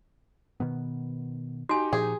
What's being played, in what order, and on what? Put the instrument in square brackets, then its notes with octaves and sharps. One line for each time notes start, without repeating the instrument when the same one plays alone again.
[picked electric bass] B2 D#3 B3
[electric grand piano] D#4 G4 [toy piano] F#4 G#5
[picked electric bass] A#2 F3 [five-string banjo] G#4